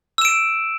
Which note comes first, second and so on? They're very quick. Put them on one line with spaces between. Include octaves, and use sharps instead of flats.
E6 E7 D7